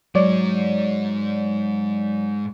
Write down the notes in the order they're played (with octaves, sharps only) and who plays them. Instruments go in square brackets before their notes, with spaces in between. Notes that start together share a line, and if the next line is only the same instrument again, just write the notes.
[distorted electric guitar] G#2 G#3 [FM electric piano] F#3 C#5 D5